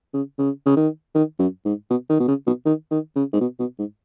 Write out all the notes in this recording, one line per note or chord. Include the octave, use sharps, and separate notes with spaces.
C#3
C#3
C#3
D#3
D#3
F#2
G#2
B2
D#3
B2
C#3
B2
D#3
D#3
C#3
G#2
B2
B2
G#2